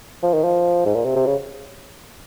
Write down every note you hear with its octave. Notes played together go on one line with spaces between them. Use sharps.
F3
D#3
F3
G#2
A#2
C3
C3
C#3